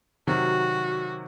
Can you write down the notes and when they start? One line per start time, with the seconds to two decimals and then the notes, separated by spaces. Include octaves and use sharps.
0.27 C3 D#3 F#3 F#4